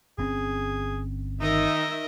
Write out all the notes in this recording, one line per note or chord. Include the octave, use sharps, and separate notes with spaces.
G1 C4 C#4 G#4
D#3 D#4 A#4 D#5 E5